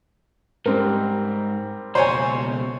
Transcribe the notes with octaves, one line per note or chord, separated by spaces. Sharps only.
G#2 G3 C4 A#4
C#2 B2 C5 C#5 G#5